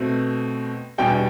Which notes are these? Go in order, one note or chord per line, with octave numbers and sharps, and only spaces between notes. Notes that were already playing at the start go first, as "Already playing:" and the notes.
Already playing: B2 A3 C4
E2 B2 G3 D4 G5